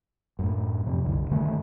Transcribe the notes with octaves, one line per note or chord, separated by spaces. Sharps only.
F#2 A2
F2 C3
D1 C2 F#2 D3
G2 D3 D#3 A3